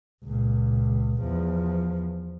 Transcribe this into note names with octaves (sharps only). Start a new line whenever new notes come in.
C#2 A#2
E2 F3